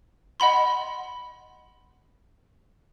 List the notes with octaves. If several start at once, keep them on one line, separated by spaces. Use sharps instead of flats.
D#5 F#5 B5 C6